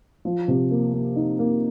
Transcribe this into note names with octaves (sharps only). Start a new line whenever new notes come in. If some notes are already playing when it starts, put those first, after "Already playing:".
F3
C3
A#3
A#3
D#4
A#3